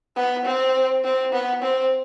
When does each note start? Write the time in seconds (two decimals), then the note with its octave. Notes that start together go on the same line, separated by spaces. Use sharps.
0.16 B3
0.45 C4
1.04 C4
1.32 B3
1.62 C4